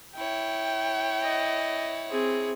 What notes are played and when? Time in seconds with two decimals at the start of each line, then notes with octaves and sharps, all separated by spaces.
0.16 E4 C#5 G5
1.23 D#5
2.09 C4 G#4